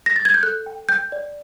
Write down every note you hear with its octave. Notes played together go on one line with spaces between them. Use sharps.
A#6
A6
G#6
G6
A4 F#6
G5
G5 G6
D5